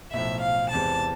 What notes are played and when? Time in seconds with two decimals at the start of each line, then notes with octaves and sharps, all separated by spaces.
0.13 B1 A2 F3 E5
0.43 F5
0.73 E2 C3 E3 G#3 C4 A5